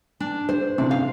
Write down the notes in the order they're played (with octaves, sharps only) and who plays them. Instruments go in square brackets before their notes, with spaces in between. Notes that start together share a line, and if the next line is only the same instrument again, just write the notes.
[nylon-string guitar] D4
C5
[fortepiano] C3 [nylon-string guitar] D4
[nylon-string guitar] F5